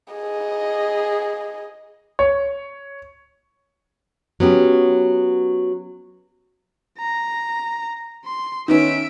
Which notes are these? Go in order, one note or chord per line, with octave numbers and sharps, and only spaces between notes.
G#4 D#5
C#5
F#3 B3 C#4 G4
A#5
C6
D#3 B3 C#4 E5 D7